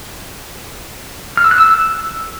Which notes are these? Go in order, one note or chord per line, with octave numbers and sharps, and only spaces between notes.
F6
E6
F#6
E6